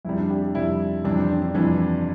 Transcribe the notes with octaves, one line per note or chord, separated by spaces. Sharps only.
F2 C3 G3 E4
D4
G4
G4
F2 C3 G3 E4
F2 C3 E3 G3 D4
C4
D4
D4
F2 C3 E3 G3 D4